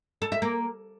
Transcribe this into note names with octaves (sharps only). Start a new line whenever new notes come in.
A4
E5
A#3